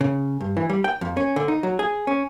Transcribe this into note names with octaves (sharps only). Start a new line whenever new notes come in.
C#3
G2
E3
G3
G5
F2
C#4
D3
D#4
F#3
G#4
C#4